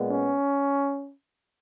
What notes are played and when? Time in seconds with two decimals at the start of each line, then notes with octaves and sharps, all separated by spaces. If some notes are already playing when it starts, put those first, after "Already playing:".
Already playing: A#2 G#3 B3
0.08 C#4